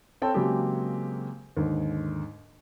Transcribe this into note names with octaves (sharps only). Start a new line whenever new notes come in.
C4 A4 C#5 G5 A5
C#3 F#3 G#3 A#3 C4 G4
D#2 G#2 D3